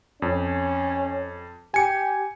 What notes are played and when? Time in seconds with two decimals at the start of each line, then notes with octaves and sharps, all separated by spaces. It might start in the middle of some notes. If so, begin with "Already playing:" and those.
0.22 F2 C#4
1.74 G4 G#5 C#7